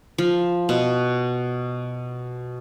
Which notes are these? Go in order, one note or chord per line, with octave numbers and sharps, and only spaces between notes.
F3
B2